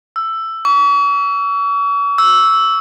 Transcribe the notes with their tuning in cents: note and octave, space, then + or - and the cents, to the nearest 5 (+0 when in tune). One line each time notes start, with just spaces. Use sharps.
E6 +10
C#6 +40
E6 -5